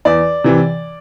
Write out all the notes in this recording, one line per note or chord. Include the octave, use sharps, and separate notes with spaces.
E2 D5
C3 E3